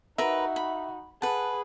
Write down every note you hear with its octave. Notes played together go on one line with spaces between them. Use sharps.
D#4 F#4 A#4 B4 E5 B5
B5
G#4 B4 F#5 A5